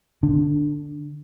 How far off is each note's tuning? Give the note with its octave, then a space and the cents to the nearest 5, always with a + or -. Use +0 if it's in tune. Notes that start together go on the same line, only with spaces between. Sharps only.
D3 +15 D4 +0